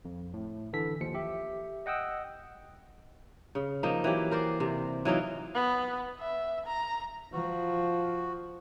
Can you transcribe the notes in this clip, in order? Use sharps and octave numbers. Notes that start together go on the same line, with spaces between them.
F2
A2
D3 E3 A4 B6
D#2 F3 C#7
G4 E5
D#5 F#5 G5 D#6 E6
C#3
F3 A#3 D#4
E3 F#3 G4
A#4 C5 D5
C3
E3 F#3 D#4 F4
B3
E5
A#5
F3 F#4